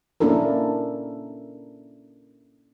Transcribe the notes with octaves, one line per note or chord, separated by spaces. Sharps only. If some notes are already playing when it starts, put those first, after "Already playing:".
A#3 C#4 D4 E4 A4 A#4